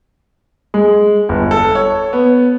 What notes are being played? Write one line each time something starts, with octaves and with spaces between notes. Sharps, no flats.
G#3
G1
A4
C#5
B3